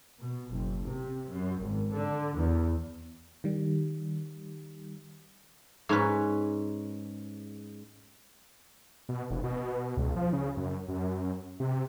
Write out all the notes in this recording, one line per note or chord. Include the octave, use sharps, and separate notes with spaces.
B2
F#1
C3
F#2
G#1
D3
E2
D#3 G3
G#2 C#4 B4
B2
F1
B2
C#2
F3
C#3
F#2
F#2
C3